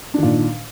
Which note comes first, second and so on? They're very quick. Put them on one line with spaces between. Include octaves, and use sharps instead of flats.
D4 D#3 A#2